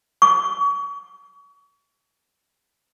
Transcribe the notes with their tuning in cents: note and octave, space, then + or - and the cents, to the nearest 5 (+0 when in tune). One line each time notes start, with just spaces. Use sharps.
C#6 +35